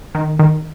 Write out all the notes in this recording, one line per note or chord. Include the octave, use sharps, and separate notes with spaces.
D#3
D#3